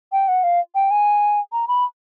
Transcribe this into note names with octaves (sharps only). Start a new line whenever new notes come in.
G5
F#5
F5
G5
G#5
A#5
B5